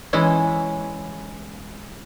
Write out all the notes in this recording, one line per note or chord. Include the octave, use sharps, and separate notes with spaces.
E3 G#3 C#4 E4